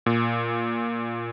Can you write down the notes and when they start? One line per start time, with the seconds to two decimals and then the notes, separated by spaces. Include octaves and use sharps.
0.06 A#2